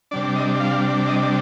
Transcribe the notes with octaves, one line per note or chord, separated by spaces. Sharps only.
C3 G3 D4 D5
D#5
F5
D#5